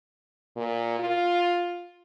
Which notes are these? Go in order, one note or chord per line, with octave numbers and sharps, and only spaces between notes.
A#2
F4